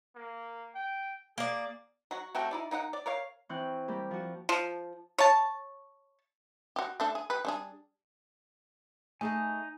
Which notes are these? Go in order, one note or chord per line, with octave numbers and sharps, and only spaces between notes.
A#3
G5
A#3 G#4 D5
F#3 F#4
C3 A3 F#4 G5
D#4 E4 D5
A#3 D#4 D#5 F#5
D5
A#4 C#5 F5
E3 C4 G5 C#6 F#6
G3 A#3 G4
F3 F#4
F3
C#5 A5
F#4 G4
A3 D4 A4
G#4
G4 B4
G3 D4 G#4
A3 D#4 G#4 D#5 G#5